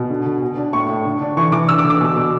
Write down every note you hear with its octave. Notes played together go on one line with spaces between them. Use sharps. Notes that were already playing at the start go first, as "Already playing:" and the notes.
Already playing: B2
D3
D3
B2
D4
A2 C#6
A2
D3
D4
E3 C#6
E3 D6
D3 E6
D6
D3
D6
B2
B2